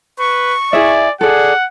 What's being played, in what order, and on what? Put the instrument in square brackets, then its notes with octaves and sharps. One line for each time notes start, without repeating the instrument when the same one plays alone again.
[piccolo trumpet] B4 [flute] C#6
[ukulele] E4 G#4 E5 [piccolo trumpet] D5
[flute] G#4 [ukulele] A4 D5 [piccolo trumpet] F#5